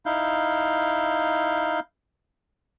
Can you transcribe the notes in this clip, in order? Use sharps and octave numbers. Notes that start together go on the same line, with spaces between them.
D#4 E4 F5 G6